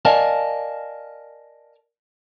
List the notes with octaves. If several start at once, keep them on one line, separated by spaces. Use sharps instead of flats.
A#4 D5 D#5 F5 G#5 A5